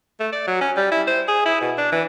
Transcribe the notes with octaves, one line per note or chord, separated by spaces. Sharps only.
A3
D5
F#3
C#4
G3
E4
C5
G#4
E4
B2
D4
E3